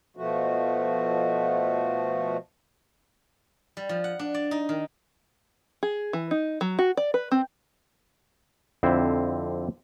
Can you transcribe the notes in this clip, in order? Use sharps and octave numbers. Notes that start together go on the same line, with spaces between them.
B2 F3 A3 F#4
G3
F3
F#5
D4
D5
D#4
D#3
G#4
E3
D#4
F#3
F#4
D5
B4
C4
F2 D3 C4 E4 C5